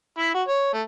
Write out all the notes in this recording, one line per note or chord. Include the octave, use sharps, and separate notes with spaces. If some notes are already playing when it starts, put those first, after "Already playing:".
E4
F#4
C#5
A3